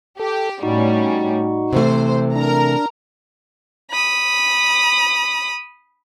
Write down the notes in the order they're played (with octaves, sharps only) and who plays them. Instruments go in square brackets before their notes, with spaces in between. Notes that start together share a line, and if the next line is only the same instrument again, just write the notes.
[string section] G4 [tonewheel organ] A4
[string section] A2 G3 C#4 [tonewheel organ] D#4 F#4
[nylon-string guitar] C3 E3 A3 [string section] C5
[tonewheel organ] D4 [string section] A#4 A#5
[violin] B5 D#6